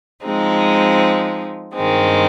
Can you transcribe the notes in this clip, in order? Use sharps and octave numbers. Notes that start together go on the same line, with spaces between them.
F3 G#3 C4 D#4
G2 D#3 G#3 C4